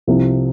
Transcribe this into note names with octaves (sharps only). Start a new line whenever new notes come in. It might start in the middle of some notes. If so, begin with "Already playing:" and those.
C2 C3 F3